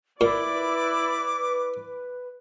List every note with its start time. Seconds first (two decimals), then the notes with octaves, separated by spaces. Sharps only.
0.21 A#2 E4 B4 D5 D6